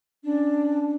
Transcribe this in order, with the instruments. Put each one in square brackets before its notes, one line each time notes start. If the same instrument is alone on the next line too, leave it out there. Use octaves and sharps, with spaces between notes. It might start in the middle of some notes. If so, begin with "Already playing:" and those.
[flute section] C#4 D4